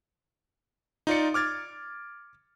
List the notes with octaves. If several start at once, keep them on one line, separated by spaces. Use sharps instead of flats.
D#4 F4 D5 C#7
D6 F6 G#6 A6